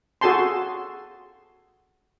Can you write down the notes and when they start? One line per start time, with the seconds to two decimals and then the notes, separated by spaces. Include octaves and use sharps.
0.21 F#4 G#4 A4 G#5 A5 C6